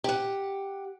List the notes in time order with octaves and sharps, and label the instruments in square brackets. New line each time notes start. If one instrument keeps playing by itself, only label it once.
[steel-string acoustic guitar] G4 F#5